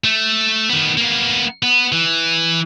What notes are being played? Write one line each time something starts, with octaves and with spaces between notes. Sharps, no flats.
A3
D#3 B3
A#3 B3
B3
E3